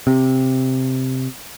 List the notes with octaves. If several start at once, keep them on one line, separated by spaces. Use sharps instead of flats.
C3